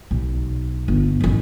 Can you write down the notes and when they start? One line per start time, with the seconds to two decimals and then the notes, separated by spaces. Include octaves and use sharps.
0.11 B1
0.88 G1
1.21 A1 F#2